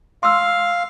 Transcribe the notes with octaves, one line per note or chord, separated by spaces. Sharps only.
F5 C6 E6